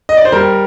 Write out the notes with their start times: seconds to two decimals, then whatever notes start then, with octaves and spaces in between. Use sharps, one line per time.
0.09 D#5
0.17 D5
0.25 C5
0.32 G3 A#4